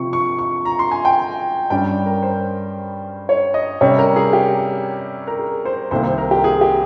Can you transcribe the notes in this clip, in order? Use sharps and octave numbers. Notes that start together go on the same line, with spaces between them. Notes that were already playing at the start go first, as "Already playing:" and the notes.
Already playing: C3 F3 C4 C#6
C#6
C#6
A#5
C6
G#5
G5
G2 G3 C#4 G5
A#4
C5
C#5
D#5
C3 G3 C#4 C#5
A#4
G#4
G4
A#4
G#4
C5
C2 C3 D#3 A#3 C5
C5
A#4
G4
G#4
G4